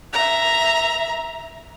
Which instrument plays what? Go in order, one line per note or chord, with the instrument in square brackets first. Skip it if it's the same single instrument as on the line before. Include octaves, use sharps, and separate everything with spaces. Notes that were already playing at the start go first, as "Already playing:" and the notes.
[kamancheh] E5 A#5